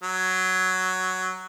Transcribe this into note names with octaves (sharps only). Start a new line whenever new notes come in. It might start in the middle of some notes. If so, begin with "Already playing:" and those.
F#3